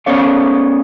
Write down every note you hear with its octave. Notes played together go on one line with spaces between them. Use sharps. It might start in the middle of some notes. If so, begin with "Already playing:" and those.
B3 C#4 A4 C#5 D5 F5